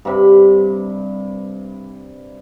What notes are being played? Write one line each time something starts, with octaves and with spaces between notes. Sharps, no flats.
G2 C3 B5